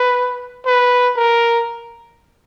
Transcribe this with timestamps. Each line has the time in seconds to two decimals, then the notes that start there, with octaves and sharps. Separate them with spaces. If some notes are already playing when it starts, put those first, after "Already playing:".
Already playing: B4
0.65 B4
1.16 A#4